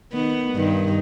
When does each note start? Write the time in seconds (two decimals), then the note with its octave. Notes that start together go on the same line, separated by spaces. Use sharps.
0.13 D#3 B3
0.53 G2 D#3